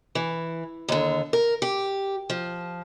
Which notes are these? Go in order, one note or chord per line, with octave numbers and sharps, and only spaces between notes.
E3
D#2 D3
A#4
G4
F3